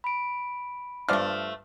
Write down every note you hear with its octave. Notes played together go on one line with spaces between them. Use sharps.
B5 D7
G2 F3 A3 D5 F6